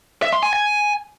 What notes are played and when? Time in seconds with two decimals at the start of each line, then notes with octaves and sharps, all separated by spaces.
0.22 E5
0.33 C6
0.43 G#5
0.53 G#5